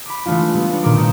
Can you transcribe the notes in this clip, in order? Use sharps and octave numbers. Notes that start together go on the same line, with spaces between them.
B5 D6
E3 G#3 A3 D4 F4
G3 G#3 B3
D4 C#5
A#2 D#3 A3 G#4 A#4 D6
A#2 G3 C#5 D#5 G6 E7